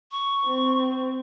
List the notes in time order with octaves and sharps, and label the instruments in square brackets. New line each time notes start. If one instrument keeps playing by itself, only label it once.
[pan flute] C#6
[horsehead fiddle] C4